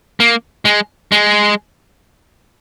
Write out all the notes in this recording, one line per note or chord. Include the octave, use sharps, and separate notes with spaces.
A#3
G#3
G#3